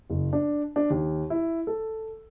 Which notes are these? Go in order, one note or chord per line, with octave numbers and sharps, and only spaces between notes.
F#1
D4
D4
D#2
E4
A4